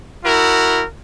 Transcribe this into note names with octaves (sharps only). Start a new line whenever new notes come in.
E4 F#4 A#4